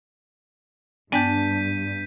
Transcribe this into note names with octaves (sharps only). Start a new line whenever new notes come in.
G2 B3 D4 G5 G#5 G6 B6 D#7